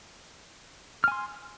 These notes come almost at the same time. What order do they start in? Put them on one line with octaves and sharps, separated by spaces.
F6 G#5 C6